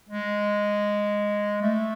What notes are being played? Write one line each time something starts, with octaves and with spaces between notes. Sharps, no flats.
G#3
A3